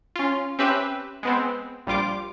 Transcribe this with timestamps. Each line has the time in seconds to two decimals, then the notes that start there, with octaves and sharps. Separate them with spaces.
0.16 C#4 F4
0.59 C4 C#4 G4 B4 E5
1.23 G#3 B3 C4
1.87 A#1 G3 F4 D6